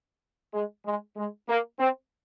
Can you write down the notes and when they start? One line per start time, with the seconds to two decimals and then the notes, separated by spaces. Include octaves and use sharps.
0.53 G#3
0.85 G#3
1.16 G#3
1.49 A#3
1.79 C4